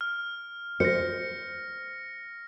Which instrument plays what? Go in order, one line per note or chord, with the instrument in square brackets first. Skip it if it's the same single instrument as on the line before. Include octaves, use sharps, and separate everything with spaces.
[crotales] F6
[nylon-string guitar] C5 [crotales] A#6 C#7